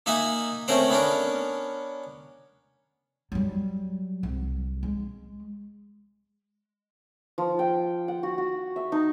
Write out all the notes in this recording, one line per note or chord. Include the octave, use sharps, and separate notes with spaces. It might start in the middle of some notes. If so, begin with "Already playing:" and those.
A#3 D#4 E5 F#5 G#5
A3 C4 C#4 A#4 C5 F#5
B3 C#4 D4 A#4
F#3 G3
C2
G#3
F3
G5
F#5
F#4
F#4
E5
D#4